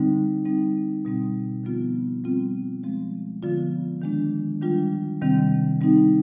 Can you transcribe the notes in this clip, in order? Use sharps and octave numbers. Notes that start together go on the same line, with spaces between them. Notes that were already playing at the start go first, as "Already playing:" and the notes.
Already playing: D3 G3 C4 D#4
G3 C4 D#4
B2 G3 C4
D3 F3 B3 F4
G3 C4 F4
F3 G#3 C4
D3 F3 B3 F4
D#3 G#3 D4
D#3 G3 D4 F4
C3 D#3 G3 C4
G3 C4 D#4